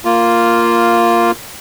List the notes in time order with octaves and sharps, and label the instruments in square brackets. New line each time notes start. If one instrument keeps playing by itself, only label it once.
[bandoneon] A#3 F4